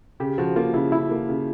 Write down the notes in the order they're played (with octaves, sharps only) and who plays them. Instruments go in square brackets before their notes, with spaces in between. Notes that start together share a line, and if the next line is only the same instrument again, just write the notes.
[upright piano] C#3 [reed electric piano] G4
[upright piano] F3 [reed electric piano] F#4
[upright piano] A#3 [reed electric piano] F4
[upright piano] C#3 [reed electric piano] E4
[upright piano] C#3 [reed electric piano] E4
[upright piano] A#3
C#3